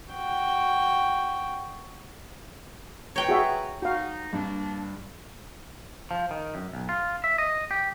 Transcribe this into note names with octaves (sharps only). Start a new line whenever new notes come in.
F#4 G5
B4 C#5 G5 A#5
F#4 G#4 E5
D#4 F#4 F5
G2 A#3 D4
F3
D#3
F#2
B1
F4
E5
D#5
G4